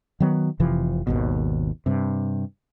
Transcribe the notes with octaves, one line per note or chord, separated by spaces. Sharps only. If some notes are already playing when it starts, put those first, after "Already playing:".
D#3 F#3 B3
F1 C3 E3 F3
G#1 D#2 B2
G2 C3